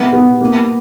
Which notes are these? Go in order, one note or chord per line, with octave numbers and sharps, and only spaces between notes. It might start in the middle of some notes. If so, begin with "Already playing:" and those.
Already playing: B3
B3
A#3